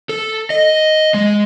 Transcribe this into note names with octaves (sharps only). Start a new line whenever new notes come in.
A4
D#5
G#3